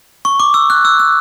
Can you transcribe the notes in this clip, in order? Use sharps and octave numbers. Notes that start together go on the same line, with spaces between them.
C#6
D6
E6
F#6
E6
E6